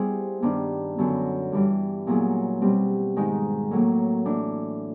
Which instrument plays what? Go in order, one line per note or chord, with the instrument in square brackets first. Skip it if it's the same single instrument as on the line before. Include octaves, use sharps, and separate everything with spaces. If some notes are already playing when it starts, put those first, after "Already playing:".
Already playing: [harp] G3 B3 E4 G#4 C5
G2 D#3 G3 B3 D4
F#2 D3 F#3 B3
G2 E3 G3
A#2 F#3 B3 E4 G#4
B2 G3 C4
G#2 D#3 G#3
A2 F#3 A#3
E3 A3 D4